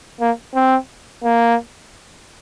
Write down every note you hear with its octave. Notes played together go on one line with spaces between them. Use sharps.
A#3
C4
A#3